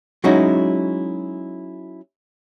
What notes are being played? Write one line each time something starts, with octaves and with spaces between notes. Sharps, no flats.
F#3 G#3 C#4 D#4 E4 F#4